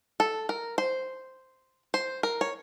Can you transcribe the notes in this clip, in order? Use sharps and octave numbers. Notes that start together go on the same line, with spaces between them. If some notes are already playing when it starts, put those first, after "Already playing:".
A4
A#4
C5
C5
A#4
C#5